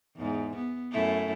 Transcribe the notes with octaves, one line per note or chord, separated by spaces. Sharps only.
E2 G#2
B3
F#2 A3 E4